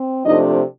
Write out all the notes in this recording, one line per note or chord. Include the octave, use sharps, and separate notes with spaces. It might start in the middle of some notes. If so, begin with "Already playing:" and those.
Already playing: C4
C3 F3 A3 D4 D#4 D#5